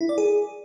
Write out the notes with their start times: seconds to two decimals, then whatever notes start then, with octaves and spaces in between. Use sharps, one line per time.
0.01 E4
0.09 D5
0.18 G#4